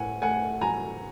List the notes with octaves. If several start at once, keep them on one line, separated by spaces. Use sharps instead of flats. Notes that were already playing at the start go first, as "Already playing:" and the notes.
Already playing: A2 A3 F#5 G#5
A3 F#5 G#5
F#3 G#5 A#5